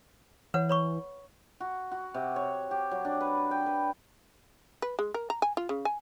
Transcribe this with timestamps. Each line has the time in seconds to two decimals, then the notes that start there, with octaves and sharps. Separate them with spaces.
0.54 E3 B4 C#5 F#5
0.69 C#5 B5 C#6
1.60 F#4
1.91 F#4
2.14 C3
2.36 C#5
2.71 G4
2.91 F#3
3.05 D4
3.21 B4
3.51 G5
3.66 B4
4.82 B4
4.99 G#3
5.14 A#4
5.30 A#5
5.42 G#5
5.57 F4
5.69 C#3
5.85 G#5